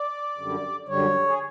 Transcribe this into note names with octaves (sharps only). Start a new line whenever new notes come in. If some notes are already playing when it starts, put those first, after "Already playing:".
Already playing: D5
F#2 D3 G3
F#2 D3 G3 C#5
G#4